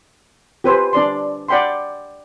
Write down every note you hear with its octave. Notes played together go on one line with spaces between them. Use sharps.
G4 B4 C5 G#5
D4 D5 C6
D5 F#5 G5 B5 C6